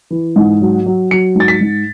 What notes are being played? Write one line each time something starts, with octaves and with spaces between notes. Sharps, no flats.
E3
G#2
F#3
F#3
F#3 C#7
G#2 A6
B6
G#2